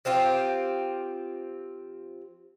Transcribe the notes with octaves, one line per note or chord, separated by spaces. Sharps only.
F3 C4 F4 G4